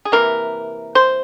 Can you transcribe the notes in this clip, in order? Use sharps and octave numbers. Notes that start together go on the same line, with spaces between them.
G#4
C3 E3 A#3 A#4
C5